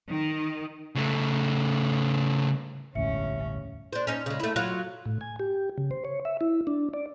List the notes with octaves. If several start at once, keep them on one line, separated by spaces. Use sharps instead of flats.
D#3
C#3 A3
E1 A1 D2 G2 C#4 E5 C#7
D4 C5
C#4 D#4
C#3 G#3
A3 E4
F#3 F4
A2
G#5
G4
C#3
C5
C#5
E5
E4
D4
D5